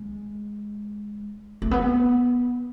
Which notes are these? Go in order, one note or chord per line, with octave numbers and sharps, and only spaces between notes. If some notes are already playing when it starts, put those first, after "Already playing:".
Already playing: G#3
A3
B3